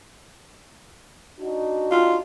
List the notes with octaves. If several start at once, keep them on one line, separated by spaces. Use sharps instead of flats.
D4 D#4 F#4
F4